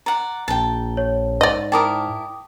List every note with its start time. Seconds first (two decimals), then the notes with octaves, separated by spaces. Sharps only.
0.06 D5 F#5 A#5
0.48 A#1 G5 A5
0.97 C#5
1.41 G#2 D5 D#5
1.72 E4 A#4 G5 A5 D6 D#6